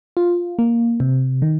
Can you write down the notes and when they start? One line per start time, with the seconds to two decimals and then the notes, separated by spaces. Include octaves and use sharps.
0.17 F4
0.59 A#3
1.00 C3
1.42 D#3